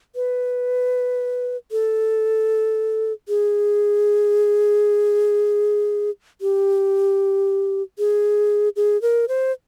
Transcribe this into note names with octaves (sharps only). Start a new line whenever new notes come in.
B4
A4
G#4
G4
G#4
G#4
A#4
C5